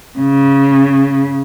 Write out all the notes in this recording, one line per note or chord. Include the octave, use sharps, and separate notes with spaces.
C#3